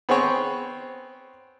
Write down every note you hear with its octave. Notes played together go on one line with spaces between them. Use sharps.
B3 C4 G#4 C5 C#5